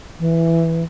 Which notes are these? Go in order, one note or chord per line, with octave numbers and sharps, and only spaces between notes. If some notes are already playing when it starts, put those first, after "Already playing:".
E3